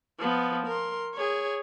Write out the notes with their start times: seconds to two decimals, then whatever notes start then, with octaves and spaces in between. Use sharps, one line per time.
0.19 F3 B3
0.67 A#4 C6
1.14 G#4 C#5